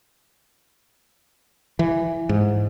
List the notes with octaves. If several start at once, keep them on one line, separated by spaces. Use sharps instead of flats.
E3
G#2